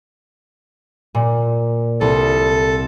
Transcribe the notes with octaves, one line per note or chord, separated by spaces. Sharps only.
A#2
C2 A4